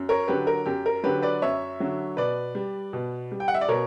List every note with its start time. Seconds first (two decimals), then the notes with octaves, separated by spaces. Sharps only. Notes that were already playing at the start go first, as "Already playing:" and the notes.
Already playing: F#2
0.09 A#4 C#5
0.28 D3 F#3 G4 B4
0.47 A#4
0.66 F#2 G4
0.86 A#4
1.03 D3 F#3 G4 B4
1.22 B4 D5
1.42 F#2 C#5 E5
1.80 D3 F#3
2.17 B2 B4 D5
2.55 G3
2.93 B2
3.32 G3
3.40 G5
3.48 F#5
3.55 E5
3.61 D5
3.68 B2 A#4 C#5